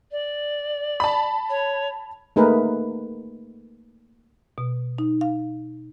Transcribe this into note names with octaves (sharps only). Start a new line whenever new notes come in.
D5
A5 B5
C#5
A3 A#3 D#4 G#4 A#4 B4
B2
D#4
F5